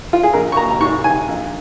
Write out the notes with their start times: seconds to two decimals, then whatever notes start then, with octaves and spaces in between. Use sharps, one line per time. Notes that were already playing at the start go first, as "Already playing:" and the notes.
0.13 F4
0.23 G#4
0.33 A#1 A#4
0.52 C#6
0.57 A#3 A#5
0.71 A#5
0.80 G#2 C#6
1.04 D#3 G#5
1.28 A#1